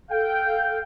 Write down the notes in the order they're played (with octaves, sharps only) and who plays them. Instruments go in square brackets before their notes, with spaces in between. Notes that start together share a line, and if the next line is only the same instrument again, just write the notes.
[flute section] A4 G6 [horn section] F5 G5